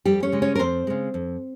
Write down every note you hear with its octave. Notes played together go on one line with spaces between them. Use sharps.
F2 G3 G4
C#4 C#5
C#3 G#3
C#4 C#5
A#4
F2 C4 C5
C#3 G#3
F2